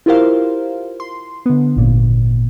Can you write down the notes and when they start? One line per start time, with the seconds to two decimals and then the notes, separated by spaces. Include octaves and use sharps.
0.06 E4 F4 G4 A#4 C5 F5
1.00 C6
1.46 D3 B3
1.77 G#1 A#2